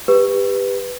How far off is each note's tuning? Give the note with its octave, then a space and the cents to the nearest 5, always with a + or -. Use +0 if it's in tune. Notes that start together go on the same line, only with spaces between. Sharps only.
G4 +20 B4 +0